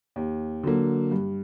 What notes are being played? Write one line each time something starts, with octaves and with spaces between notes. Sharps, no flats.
D#2
D3 F#3 A#3
G2